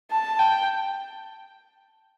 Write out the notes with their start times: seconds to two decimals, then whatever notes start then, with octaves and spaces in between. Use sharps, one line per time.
0.11 A5
0.39 G5